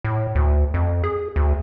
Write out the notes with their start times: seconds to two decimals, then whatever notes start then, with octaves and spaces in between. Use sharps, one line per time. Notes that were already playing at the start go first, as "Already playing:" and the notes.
0.04 A2
0.35 D2
0.74 F2
1.04 G#4
1.36 D2